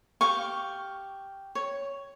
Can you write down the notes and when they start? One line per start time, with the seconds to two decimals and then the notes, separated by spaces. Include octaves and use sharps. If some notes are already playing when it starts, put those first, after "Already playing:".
0.21 G4 F5 C#6
1.55 C#5